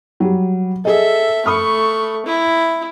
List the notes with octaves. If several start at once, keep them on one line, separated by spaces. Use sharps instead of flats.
F#3 G3
G#4 A4 D#5 E5
A3 B5 C#6 D#6 F6
E4